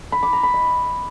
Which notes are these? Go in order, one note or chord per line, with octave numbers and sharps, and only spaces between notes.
B5
D6
A#5
B5
D#5